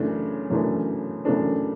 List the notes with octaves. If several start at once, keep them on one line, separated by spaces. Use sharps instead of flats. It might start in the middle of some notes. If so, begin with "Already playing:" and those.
Already playing: F#2 C#3 E3 A3 D4
F#2 C#3 E3 A3 D4
F#2 C#3 E3 A3 D4